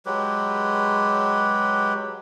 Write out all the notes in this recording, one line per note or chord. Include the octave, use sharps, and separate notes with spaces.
F#3 G#3 G4 B4